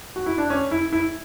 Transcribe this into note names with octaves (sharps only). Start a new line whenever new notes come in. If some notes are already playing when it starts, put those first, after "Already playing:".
F#4
E4
D4
C#4
E4
E4